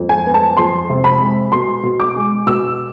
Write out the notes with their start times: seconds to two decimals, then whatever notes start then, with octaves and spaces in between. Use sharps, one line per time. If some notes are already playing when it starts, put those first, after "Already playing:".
Already playing: F2
0.09 G#5
0.26 B3
0.34 A5
0.57 F2 C6
0.89 C3
1.04 B5
1.20 G#3
1.52 B2 C6
1.83 B2
2.00 D6
2.16 G#3
2.47 B2 E6